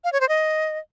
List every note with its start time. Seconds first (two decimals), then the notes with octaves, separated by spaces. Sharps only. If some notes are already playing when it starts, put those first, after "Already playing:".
0.04 F5
0.12 C#5
0.21 C5
0.29 D#5